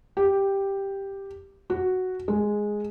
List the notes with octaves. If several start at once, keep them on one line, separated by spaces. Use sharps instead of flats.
G4
F#4
G#3